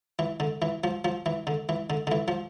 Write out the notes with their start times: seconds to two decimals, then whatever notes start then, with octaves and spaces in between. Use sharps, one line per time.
0.19 E3
0.40 D3
0.62 E3
0.84 F3
1.05 F3
1.26 E3
1.47 D3
1.69 E3
1.90 D3
2.07 D3
2.12 E3
2.28 F3